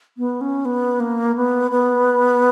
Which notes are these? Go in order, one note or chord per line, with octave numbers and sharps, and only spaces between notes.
B3
C#4
B3
A#3
B3
B3